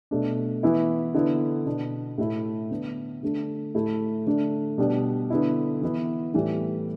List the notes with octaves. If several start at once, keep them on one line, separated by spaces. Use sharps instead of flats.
B2 A3 D4
E3 B3 E4
D3 B3 E4
B2 B3 D4
A2 A3 E4
D3 B3 D4
D3 A3 D4
A2 A3 E4
D3 A3 D4
B2 G3 B3 D4
D3 B3 E4
E3 B3 E4
A2 E3 G3 B3